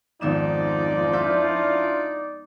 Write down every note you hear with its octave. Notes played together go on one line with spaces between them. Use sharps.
G#1 F2 F3 B3 D#4 D5 E7
D4 E4 F4 E6 G6 B6